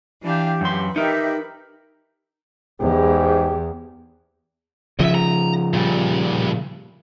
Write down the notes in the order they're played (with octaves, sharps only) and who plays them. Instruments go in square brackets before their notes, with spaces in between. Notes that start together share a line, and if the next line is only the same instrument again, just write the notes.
[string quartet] E3 D4 F5 [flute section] G4
[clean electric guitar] F#2 C6 [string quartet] B4
[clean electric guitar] D#4 A#4 [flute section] G4 D#5 E5
[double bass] E2 [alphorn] G#2 [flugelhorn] G4
[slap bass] C#3 F3 [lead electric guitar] D#5 E5
[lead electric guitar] A#5
A#2 G3